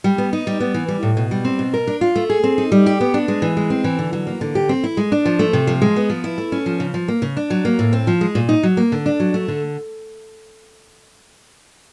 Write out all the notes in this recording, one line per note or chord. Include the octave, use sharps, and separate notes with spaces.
G3
B3
D#4
G3
B3
E3
G3
A2
B2
G3
C4
B2
A#4
D4
F4
A3
G#4
C4
D#4
G3
G4
B3
D4
G#3
E3
G#3
C4
E3
D3
F#3
A#3
D3
G4
C4
E4
G#3
D4
F3
A3
C3
F3
G#3
B3
F3
E4
A3
C#4
F3
C#3
F3
A#3
C#3
D4
F#3
A#3
A2
C4
F3
G#3
A#2
D#4
F#3
A#3
D3
D4
F#3
A3
D3